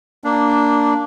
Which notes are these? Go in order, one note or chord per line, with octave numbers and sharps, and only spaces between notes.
A#3 D4